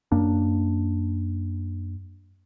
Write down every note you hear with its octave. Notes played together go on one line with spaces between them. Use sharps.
F#2 A#3 D4